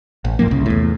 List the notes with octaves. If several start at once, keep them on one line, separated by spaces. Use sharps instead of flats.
A1
F1 G#2 F3 A#3
C2 C#3
E2 A2